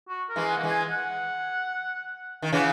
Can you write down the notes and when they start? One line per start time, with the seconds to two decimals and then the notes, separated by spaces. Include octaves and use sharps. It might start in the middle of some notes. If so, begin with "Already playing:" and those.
0.09 F#4
0.29 A#4
0.36 E3 G#3
0.50 F#5
0.57 A#3
0.63 E3 G#3
0.70 G#5
0.90 F#5
2.42 D#3
2.52 C#3 E3 F#5